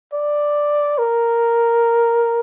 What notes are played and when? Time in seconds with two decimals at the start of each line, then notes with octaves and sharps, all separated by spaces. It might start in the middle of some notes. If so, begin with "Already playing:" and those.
0.13 D5
0.98 A#4